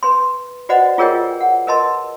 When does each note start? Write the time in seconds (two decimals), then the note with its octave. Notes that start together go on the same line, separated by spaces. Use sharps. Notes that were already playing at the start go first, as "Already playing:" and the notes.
0.03 B4 C6
0.69 F#4 B4 C5 D5 D#5 F#5
0.98 F4 G#4 A#4 C#5 D#5 G5
1.41 F#5
1.67 A#4 B4 D#5 A5 C6